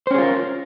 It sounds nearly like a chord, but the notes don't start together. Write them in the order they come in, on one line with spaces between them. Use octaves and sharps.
C5 C#4 G#4 F4 A#4